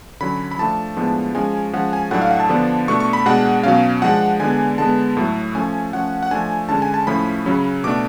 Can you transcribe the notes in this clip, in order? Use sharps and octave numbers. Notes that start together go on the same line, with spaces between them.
D3 F#3 C#4 B5
B5
F3 A3 D4 A5
A2 F3 G#3 B3 D4
F3 G#3 C#4 G#5
F3 G#3 C#4 F#5
G#5
A2 F#3 A3 D4 F#5
F5
F#5
A5
D3 F3 B3 D4
B2 A3 D4 C#6
C#6
B5
B2 G#3 D4 F#5
B2 F#3 C#4 F5
F3 G#3 D4 F#5
D3 G#3 B3 D4 G#5
D3 G#3 B3 A5
A2 F#3 A3
F3 A3 C#4 G#5
F3 A3 C#4 F#5
F#5
F3 A3 D4 G#5
D3 G#3 C#4 A5
G#5
A5
A2 F3 A3 C#4 B5
C#3 F#3 C#4
B2 A3 D4 D6